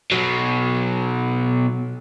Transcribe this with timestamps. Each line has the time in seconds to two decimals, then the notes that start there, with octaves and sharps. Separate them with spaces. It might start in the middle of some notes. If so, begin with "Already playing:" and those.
0.12 B2 F#3